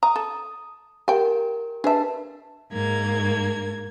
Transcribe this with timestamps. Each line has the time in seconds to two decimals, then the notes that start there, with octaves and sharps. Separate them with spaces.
0.03 A#5 D#6
0.16 A4
1.08 G4 A#4 G5 G#5
1.84 D4 G#4 B4 E5 A5
2.71 G#2 A#3 G#6